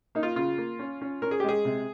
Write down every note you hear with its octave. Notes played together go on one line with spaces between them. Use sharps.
A#3 D#4
F4
C#3 F4
A#3
C#4
C#4
C#4 A#4
G#4
G4
G#3 G#4
C3